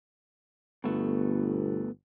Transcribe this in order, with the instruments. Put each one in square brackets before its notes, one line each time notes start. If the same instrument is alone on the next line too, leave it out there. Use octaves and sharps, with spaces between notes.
[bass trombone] G1 [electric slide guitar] B2 A3 B3